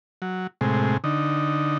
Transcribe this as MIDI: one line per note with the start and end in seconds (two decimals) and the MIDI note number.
0.22 0.47 54
0.61 0.97 45
0.61 0.97 48
0.61 0.97 56
1.04 1.78 50
1.04 1.78 63